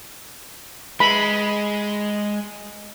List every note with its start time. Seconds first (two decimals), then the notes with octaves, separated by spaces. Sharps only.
1.00 G#3 B5